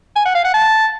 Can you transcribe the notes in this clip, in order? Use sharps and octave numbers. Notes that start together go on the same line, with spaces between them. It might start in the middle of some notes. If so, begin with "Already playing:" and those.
G#5
F#5
F5
F#5
A5